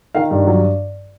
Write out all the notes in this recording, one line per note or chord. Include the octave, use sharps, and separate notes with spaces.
D#3 F5
G2
F#3